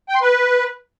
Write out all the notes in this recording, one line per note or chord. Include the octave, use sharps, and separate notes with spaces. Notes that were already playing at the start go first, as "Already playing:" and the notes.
G5
C6
B4